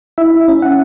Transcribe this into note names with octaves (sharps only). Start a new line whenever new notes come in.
E4 E5
C#4
F#5